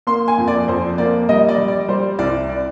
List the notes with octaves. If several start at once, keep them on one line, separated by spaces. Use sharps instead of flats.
A#3 C6
G#5
F2
D5
F2 C5
A#3 D5
G3 D#5
D5
G3
D5
G3 C5
C2 D5
D5